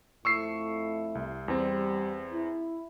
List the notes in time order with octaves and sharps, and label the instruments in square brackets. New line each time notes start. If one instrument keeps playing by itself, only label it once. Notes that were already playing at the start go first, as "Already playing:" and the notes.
[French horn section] F2 A3 E4 [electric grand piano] C#6 E6 C7
[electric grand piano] C2
[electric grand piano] E2 C4 [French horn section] G3
[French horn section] E4